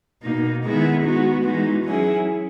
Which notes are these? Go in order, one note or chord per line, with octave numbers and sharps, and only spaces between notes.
B2 A#3 D#4
D#3 G#3 B3 E4 G#4
G#3 B3 D#4 F#4
E3 G#3 D#4 F#4
F#3 C#4 E4 G#4